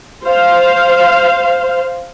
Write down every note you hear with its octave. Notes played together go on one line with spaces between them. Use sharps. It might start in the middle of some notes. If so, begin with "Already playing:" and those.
C5 F5